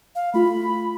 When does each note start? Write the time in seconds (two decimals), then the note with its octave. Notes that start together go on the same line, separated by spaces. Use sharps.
0.15 F5
0.34 A3 F4 B5